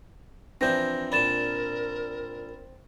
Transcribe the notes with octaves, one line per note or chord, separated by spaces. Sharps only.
E3 F3 C4 D4 G6 A#6
A#2 D4 A#4 B5 A6 E7